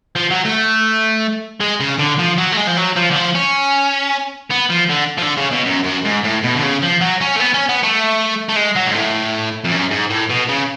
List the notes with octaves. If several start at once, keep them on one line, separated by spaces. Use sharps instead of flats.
F3
F#3
A3
G#3
C#3
D3
F3
F#3
A3
G#3
F3
F#3
F3
D3
F3
C#4
B3
F3
D3
F3
D3
C#3
B2
F#2
F#2
G#2
A2
B2
D3
C#3
F3
F#3
C#4
A3
B3
C#4
B3
A3
A3
G#3
F#3
G#2
A2
F2
F#2
G#2
A2
B2
C#3